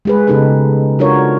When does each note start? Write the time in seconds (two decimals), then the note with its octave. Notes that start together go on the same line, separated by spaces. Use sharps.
0.05 G#3 G#4 B4
0.27 C#3 B3 D#4 G4 A4 B4
0.99 D4 F4 F#4 A#4 C#5